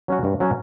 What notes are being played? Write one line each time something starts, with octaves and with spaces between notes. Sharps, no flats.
F#3 C#4 F#4
G2
F#3 C#4 F#4